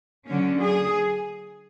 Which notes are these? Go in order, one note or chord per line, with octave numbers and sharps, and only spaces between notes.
D3 F#3 C#4
G#4